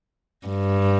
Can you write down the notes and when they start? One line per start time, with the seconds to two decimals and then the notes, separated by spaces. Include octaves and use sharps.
0.47 G2